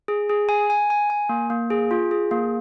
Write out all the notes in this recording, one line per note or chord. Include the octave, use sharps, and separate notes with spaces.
G#4
G#4
G#5
G#5
G#5
G#5
A#3
A#3
G#4
F4
G#4
A#3